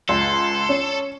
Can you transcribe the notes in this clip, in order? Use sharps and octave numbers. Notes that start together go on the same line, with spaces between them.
C#2 A4 C6
C#4